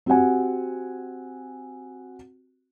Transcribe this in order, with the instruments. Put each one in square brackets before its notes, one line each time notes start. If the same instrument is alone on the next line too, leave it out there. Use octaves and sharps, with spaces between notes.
[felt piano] C4 F#4 G4 F#5 G#5